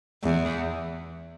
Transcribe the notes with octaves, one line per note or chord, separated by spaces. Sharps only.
E2